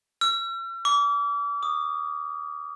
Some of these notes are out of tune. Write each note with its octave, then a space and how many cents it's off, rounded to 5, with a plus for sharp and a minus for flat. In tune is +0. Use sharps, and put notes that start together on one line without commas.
E6 +45
D6 -35
D#6 -25